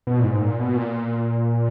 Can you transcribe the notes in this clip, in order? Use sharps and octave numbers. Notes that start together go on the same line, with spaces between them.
B2
A#2
G#2
A#2
B2
A#2